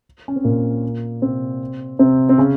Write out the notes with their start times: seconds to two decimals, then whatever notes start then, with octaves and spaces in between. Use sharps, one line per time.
0.28 C#4
0.36 C4
0.44 A#2 A#3
1.22 C3 C4
1.99 C3 C4
2.29 C4
2.38 C#3 C#4